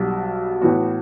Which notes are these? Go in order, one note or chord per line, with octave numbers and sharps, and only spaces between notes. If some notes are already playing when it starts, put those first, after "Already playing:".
Already playing: B1 B2 G3
A2 E3 B3 F#4